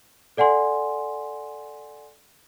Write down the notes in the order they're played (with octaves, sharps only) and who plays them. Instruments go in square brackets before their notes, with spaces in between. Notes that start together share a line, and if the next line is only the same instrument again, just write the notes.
[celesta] A4 D5 F#5 G#5 C6